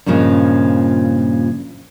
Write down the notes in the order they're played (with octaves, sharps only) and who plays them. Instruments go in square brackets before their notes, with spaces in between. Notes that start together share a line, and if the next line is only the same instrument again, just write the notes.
[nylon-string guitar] G2 A#2 C#3 F3 G#3